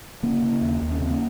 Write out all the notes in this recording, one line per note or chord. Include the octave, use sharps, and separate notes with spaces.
C#3 A#3 C#4
C#3
D#2
D#2
C#4
C#3 C4
A#3 C#4